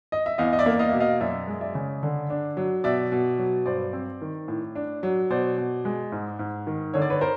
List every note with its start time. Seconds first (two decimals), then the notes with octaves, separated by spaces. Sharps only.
0.12 D#5
0.26 E5
0.38 E2 D#5 F5
0.53 D#5
0.59 D5 E5
0.66 A#3
0.79 D#5 F5
0.90 B2 E5
1.00 D#5 F5
1.20 F#2 D5 E5
1.48 G#3
1.61 D5 E5
1.75 C#3
2.03 D3
2.30 D4
2.57 F#3
2.84 B2 D5 E5
3.12 B2
3.38 F#3
3.66 G2 C5 D5
3.93 C4
4.22 D#3
4.48 A2
4.75 D4
5.03 F#3
5.30 B2 C5 D5
5.58 B2
5.85 G#3
6.12 G#2
6.39 G#2
6.67 D#3
6.94 D3 C#5
7.02 D5
7.10 B4 C#5
7.21 A#4 C5